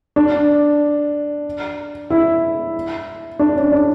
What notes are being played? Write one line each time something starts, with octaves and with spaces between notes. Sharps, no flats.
D4
E4
D4
C#4
D4